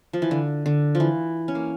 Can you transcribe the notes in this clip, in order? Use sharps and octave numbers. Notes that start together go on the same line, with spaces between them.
F3
E3
D3
D3
F3
E3
C#4
A#3